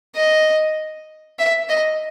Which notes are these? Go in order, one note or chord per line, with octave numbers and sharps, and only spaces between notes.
D#5
E5
D#5